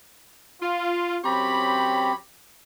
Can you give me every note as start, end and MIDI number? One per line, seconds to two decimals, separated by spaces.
0.61 1.18 65
1.24 2.15 42
1.24 2.12 60
1.24 2.12 67
1.24 2.15 73
1.24 2.15 83